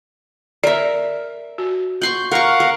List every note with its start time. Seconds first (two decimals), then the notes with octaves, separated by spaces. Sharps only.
0.63 A#4 D5 E5
1.58 F#4
2.02 F#5 C6 C#6 G6
2.31 A#4 F5 F#5 C#6
2.60 A#4